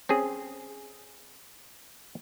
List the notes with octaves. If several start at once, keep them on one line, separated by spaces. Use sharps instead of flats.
C4 C#4 G#4